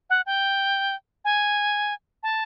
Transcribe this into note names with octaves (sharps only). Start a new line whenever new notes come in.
F#5
G5
G#5
A5